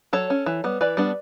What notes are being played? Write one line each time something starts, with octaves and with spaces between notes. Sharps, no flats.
F#3 A4 C#5
C#4
E3
G3 B3
E3 B4 D5
G3 B3 D4